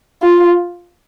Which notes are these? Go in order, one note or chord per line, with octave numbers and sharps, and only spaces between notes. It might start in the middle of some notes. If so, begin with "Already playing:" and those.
F4